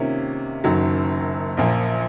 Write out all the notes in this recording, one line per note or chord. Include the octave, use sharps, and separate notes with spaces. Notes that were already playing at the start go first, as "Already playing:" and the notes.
Already playing: C3 D#3 A#3 C#4 F4
F#1 F#2 D#3 F#3
A#1 A#2 F3 A#3